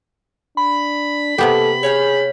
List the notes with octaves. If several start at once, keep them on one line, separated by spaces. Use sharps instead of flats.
D4 B5
C3 A#3 B3 G4 A4
G#4 C#5 F5 G5